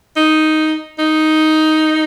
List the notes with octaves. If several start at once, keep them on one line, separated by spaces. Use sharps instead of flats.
D#4
D#4